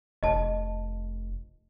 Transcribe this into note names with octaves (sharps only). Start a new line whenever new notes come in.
F1 D#5 A5